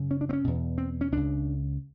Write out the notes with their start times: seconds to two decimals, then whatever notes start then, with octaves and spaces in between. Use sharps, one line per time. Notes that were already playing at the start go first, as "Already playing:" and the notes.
Already playing: F#2 C#3
0.11 C#4
0.21 D4
0.29 C4
0.33 C#4
0.44 E2 B2
0.78 C4
1.01 C#4
1.12 C#2 C#3 D4